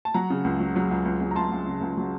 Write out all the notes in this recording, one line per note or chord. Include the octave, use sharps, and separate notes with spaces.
A5
F#3 F#5 A#5
C#3
C#2
F#3
F#3
C#2
C#2
C#2
A#5
C#2 A5 C6
C#2
C#3
C#2
F#3